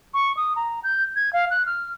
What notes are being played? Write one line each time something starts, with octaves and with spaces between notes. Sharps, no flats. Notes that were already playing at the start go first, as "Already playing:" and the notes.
C#6
D#6
A#5
G6
G#6
F5
F#6
F6